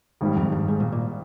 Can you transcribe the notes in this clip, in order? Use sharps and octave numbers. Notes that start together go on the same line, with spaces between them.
G#1 G#2 G3
F2
G2
G#2
A#2
A#2